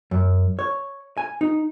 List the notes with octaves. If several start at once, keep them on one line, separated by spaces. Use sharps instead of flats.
F#2
C#5
G#5
D#4